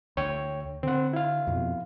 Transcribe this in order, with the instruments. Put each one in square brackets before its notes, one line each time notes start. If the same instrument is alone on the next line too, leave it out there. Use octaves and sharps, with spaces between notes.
[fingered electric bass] D2 [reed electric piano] C#5 G5
[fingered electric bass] D3 [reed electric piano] C4 F#5
[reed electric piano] E4 F5
[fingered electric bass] F2 B2